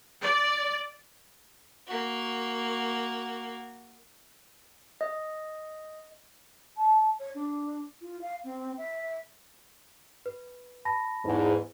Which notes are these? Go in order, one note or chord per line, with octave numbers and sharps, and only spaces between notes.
D5
A#3 F#4
D#5
A5
C#5
D4
F4
F5
C4
E5
B4
A5 B5 A#6
E2 G#2